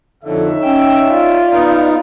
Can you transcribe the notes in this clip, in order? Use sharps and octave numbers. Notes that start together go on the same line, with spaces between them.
F2 D3 D#4 C#5 E5
C#4 G5 E6
F4 D5
B3 D#4